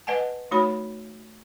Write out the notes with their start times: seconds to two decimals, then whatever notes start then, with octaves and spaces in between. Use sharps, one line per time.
0.07 B4 D#5 F#5 G#5 A5
0.51 A3 D#4 F#4 C#5 B5